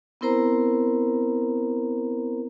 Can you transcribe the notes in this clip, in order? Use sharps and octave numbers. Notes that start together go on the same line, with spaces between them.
B3 C4 E4 A#4 C5 A#5